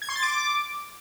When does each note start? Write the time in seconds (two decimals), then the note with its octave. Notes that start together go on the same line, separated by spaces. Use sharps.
0.02 G#6
0.09 C6
0.16 A6
0.23 D6